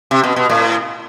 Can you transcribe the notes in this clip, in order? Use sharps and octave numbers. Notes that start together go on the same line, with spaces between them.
C3
B2
B2
A2